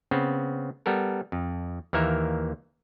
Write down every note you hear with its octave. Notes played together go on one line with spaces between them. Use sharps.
C#3 B3 C4
G3 B3 A4 A#4
F2
D#2 E3 A#3 A#4 E5